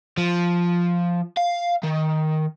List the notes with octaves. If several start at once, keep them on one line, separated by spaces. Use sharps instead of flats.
F3
F5
D#3